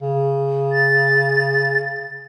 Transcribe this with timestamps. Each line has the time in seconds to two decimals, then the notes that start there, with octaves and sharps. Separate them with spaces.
0.02 C#3
0.72 A6